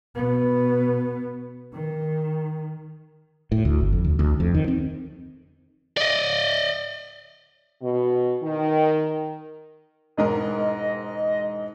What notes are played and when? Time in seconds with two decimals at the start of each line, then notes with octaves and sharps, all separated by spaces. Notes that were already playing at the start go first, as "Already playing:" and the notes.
0.15 B2 B3
1.74 D#3
3.52 A2
3.65 D2
3.81 G1
3.93 F2
4.04 D2
4.19 D2
4.40 F2
4.54 D#3
4.68 C4
5.97 D5 D#5
7.81 B2
8.42 D#3
10.17 E1 G#2 A#4 D#5